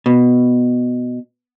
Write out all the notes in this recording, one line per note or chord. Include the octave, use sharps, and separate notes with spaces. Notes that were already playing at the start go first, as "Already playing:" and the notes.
B2